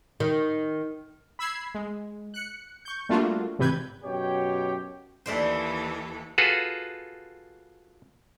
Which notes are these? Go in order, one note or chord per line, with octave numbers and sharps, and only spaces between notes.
D#3
B5 E6 G#6 C7
G#3
F#6 C#7
C#6 G6
G3 A3 A#3 D4 F4 F#4
G#1 C3 E3 B4 G6 G#6
F#2 B2 F#4 G4 C#5 G5
D#2 E3 A4 C5 D5 E5
F4 F#4 G#4 A4 B4